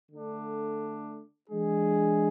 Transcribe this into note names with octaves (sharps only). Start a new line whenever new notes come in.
D3 A3 D4
E3 G#3 D4 G#4